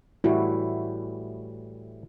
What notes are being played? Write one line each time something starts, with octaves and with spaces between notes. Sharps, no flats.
A2 E3 G3 E4 F#4